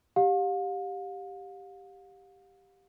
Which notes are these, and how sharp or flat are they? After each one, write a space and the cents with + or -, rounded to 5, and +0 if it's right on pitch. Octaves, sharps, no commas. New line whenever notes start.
G4 +0 F5 +40